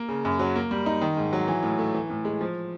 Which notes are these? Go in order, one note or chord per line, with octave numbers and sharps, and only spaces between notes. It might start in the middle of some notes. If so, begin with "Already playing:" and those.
Already playing: A#3
C#3
F#2
F#3
A#3
G3
D#4
D#3
G#2
F#3
E3
A2
A3
E3
A2
G#3
F3